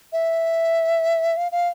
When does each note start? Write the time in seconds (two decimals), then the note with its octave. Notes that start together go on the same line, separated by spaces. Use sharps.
0.13 E5
1.37 F5
1.52 F5